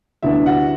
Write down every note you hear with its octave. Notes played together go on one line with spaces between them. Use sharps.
D2 D3 G3 B3 D4 E4 E5
F#4 F#5